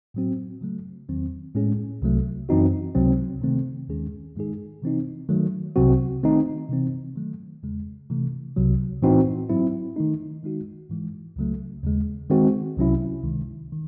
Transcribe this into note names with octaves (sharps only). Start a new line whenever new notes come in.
A2 F#3 C4 F#4
C#3 F#3 A3
E2 D#3 F#3 C4
A2 G#3 C#4 G#4
C2 C3 F#3 A3
F#2 E3 C4 D#4 F#4
C#2 C3 F#3 C4
C3 D#3 A3 C4
D#2 D#3 G#3 C#4 G#4
G#2 D#3 G#3 D#4 G#4
C3 E3 C4 D#4
D#3 F#3 A3
C2 C3 F#3 C4 F#4
D#3 A3 C4 D#4
C3 E3 C4
D#3 F#3 A3
E2 C#3 G#3
C3 E3 A3
C2 C3 F#3
A2 E3 C4 D#4 F#4
G#2 F#3 C4 E4
D#3 A3 D#4
D#3 G#3 D#4 F#4
G#2 E3 G#3
C#2 C#3 F#3 A3
D#2 C#3 G#3
D#3 G#3 C4 F#4
C2 C3 F#3 C#4 E4
C#2 C3 D#3 G#3
D#3